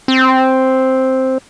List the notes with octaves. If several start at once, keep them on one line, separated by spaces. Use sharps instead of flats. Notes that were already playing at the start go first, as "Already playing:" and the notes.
C4